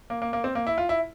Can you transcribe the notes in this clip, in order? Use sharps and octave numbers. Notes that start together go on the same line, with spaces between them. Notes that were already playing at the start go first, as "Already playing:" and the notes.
A#3
A#3
A#3
C4
A#3
E4
F4
E4